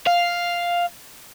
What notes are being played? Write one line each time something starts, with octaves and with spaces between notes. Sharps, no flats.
F5